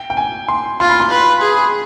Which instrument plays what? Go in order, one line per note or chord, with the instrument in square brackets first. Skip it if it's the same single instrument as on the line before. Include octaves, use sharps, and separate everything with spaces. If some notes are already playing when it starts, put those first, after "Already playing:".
Already playing: [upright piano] G5
G5
G#5
C6
[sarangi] F4 [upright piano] C6
[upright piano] B5
C6
[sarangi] B4
G#4